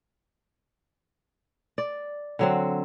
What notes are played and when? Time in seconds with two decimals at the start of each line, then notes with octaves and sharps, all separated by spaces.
1.78 D5
2.39 D3 F#3 C4